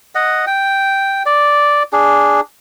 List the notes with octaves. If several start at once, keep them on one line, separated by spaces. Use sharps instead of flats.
D#5 F#5
G5
D5
D4 G#4